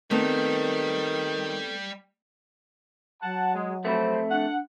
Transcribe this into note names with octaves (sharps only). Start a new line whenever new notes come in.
D#3 G3 A3 B3 C4
F#3 F#5 A5
G#3
F2 A3 C4 C5 B5
D4 F#5